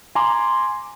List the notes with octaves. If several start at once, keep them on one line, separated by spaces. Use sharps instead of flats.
G#5 A#5 C6 D6